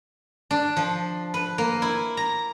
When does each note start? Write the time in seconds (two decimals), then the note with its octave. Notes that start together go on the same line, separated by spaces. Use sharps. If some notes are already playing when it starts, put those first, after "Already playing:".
0.51 D4
0.77 F3
1.34 B4
1.58 A#3
1.82 E4
2.17 A#5